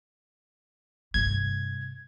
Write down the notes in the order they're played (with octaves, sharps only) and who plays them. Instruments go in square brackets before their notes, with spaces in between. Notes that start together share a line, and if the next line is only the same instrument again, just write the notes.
[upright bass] G2 C3 [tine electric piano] G#6